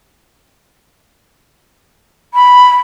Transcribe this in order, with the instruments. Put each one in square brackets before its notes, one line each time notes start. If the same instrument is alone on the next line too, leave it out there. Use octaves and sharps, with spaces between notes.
[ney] B5